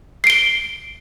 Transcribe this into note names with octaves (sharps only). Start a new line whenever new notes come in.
C7 D7 G7